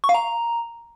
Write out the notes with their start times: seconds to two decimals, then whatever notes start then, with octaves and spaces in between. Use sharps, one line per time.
0.04 C#6
0.09 F5
0.15 A#5